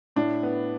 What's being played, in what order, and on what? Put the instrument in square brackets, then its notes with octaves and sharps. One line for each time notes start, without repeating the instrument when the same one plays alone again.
[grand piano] A2 [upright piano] D4
[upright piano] B3